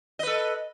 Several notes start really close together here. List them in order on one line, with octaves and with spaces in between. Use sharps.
D#5 B4 A4